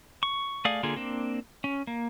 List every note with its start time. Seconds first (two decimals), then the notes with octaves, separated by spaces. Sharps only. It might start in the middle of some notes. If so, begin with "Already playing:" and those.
0.23 C#6
0.65 A3 G#4 D5 F5 D#6
0.83 D3 A#3 F4 G#4
0.96 A#3 C4 D4
1.64 C#4
1.87 A#3